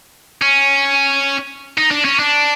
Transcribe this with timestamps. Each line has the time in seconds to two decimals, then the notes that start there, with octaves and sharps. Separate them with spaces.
0.42 C#4
1.78 D#4
1.91 D4
2.05 C#4
2.19 D4